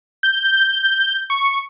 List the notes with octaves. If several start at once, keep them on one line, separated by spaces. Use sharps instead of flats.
G6
C#6